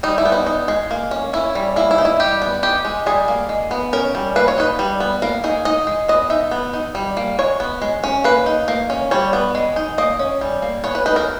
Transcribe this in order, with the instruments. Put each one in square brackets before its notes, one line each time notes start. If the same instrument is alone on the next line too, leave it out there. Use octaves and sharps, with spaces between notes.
[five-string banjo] G3 D#4
E4
B3
D#4
D#4
G#3
A#3
C#4
C#4 E4
G3
A#3 E4
E4
D#4
E4
G3 G4
B3
D#4 G4
G#3
G3 G#4
A#3
G#3
B3
C#4 A#4
G3
A#3 B4
C#5
D#4 B4
G3
B3
A#3 A#4
D#4 G#4
D#4 D#5
G#3
B3 D#5
D#4 E5
B3
D#4
G3
A#3
G#3 C#5
B3
G#3
C#4
A#3 B4
D#4
A#3
C#4
G3 C#5
B3
G#3
D#4
A#3 D#5
C#4
G3
A#3
B3 C#5
B4
D#4 B4
A#4